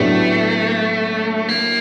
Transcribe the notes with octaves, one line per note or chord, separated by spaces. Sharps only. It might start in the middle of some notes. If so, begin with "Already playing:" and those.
Already playing: A2 F#3 A3 B3 D4 G4
A#3